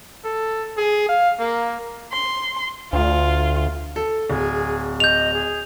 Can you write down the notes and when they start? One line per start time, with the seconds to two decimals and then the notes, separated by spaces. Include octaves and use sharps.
0.24 A4
0.77 G#4
1.09 F5
1.40 A#3
2.13 C6
2.93 D2 F4
3.96 A4
4.30 D1 G#4
5.00 D#5 G6 F7
5.34 G#4